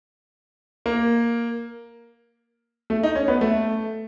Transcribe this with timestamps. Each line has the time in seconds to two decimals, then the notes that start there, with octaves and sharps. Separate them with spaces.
0.86 A#3
2.90 A3
3.03 D#4
3.15 C#4
3.28 B3
3.41 A3